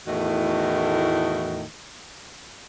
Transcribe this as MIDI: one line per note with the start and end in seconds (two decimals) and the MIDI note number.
0.07 1.64 40
0.07 1.64 45
0.07 1.64 51
0.07 1.64 57
0.07 1.64 66